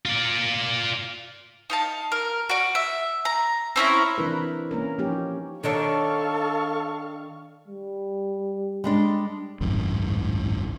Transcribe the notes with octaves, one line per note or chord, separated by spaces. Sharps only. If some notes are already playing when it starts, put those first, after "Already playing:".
F4 D5
D#4 F5 A5
A#4
F#4 D5
E5
A#5
C4 C#4 E4 A#5
E3 C4 D4 E4 A#4 B4
A#3 C#4 A#4
F3 A#3 C#4 D#4 G4
D#3 D4 A4 C#5 F5 C#6
G3
G3 G#3 D4
G#1 C#2 F#2 A2